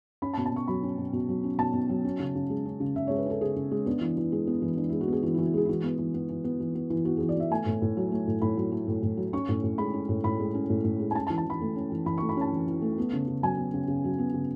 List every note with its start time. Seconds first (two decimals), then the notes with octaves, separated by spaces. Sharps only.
0.22 C#4 B5
0.33 A5
0.37 B2
0.46 A5
0.52 B2 C#6
0.68 F#3 B5
0.83 C#4
0.98 B2
1.13 B2
1.29 F#3
1.44 C#4
1.58 B2 A5
1.73 B2
1.89 F#3
2.05 C#4
2.20 C#3
2.35 C#3
2.50 G#3
2.65 C#4
2.80 C#3
2.96 C#3 E5
3.07 G#3 C#5
3.18 B4
3.26 C#4 A4
3.41 C#3 G#4
3.56 C#3
3.71 G#3
3.86 B3 D4
4.01 E3
4.17 E3
4.32 G#3
4.47 B3
4.62 E3
4.77 E3 D4
4.89 G#3 E4
5.01 F#4
5.08 B3 G#4
5.23 E3 F#4
5.34 E4
5.38 E3
5.46 E4
5.54 G#3 G#4
5.65 E4
5.69 E3 F#4
5.83 B3
5.99 E3
6.14 B3
6.29 E3
6.44 B3
6.60 E3
6.75 B3
6.90 E3
7.05 B3 F#4
7.17 E3 G#4
7.29 D5
7.36 B3 E5
7.51 A3 G#5
7.66 A2
7.82 A2
7.97 F#3
8.12 A3
8.27 A2
8.42 A2 B5
8.57 F#3
8.72 A3
8.88 A2
9.03 A2
9.17 F#3
9.33 C#4 C#6
9.49 A2
9.64 A2
9.78 G#3 B5
9.93 C#4
10.09 A2
10.24 A2 B5
10.40 G#3
10.54 C#4
10.70 A2
10.84 A2
11.00 G#3
11.11 G#5
11.15 C#4 A5
11.27 A5
11.30 E3
11.38 A5
11.46 E3 B5
11.61 A3
11.76 C#4
11.92 E3
12.06 E3 B5
12.18 A3 C#6
12.29 B5
12.37 C#4 A5
12.52 E3
12.67 E3
12.82 A3
12.98 B3
13.13 C#3
13.28 C#3
13.43 F#3 G#5
13.58 B3
13.74 C#3
13.88 C#3
14.04 F#3
14.19 B3
14.34 C#3